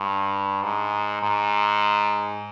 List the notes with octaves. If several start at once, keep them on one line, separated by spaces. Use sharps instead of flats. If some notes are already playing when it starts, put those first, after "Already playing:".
Already playing: G2
G#2
G#2